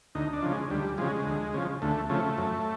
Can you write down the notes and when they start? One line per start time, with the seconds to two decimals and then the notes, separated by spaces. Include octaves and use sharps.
0.15 D2 D#4
0.33 D4
0.42 C#3 F3
0.52 G#3
0.70 D2 G3
0.98 C#3 F3 G#3
1.26 D2
1.54 C#3 F3
1.82 D2 A3
2.09 C#3 F3 A3
2.38 F#2